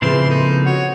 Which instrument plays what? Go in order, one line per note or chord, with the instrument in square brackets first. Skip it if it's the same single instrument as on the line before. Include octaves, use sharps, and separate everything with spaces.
[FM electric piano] A2 G#4 [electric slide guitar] C#3 F3 C4 [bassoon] E3 [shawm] C6
[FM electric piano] A#3 A4 [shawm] D#4
[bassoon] F#4 [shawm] C#5